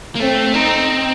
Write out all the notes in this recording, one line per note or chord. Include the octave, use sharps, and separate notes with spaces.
A#3
A3 C4
C4 D#4